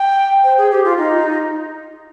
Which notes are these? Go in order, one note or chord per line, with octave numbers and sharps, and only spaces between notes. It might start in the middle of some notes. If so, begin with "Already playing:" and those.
Already playing: G5
C5
G#4
G4
F4
D#4